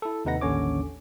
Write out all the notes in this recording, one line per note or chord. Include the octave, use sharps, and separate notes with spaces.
E4 A4
D#2 C3 D#4 B4 F#5 A#6
A1 D#2 D3 C#4 C#5 D6